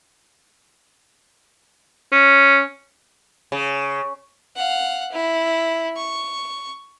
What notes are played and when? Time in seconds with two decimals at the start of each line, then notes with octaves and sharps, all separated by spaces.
2.12 C#4
3.52 C#3
4.57 F5 F#5
5.12 E4
5.97 C#6